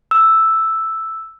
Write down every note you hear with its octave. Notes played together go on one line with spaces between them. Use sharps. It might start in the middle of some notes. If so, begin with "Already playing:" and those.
E6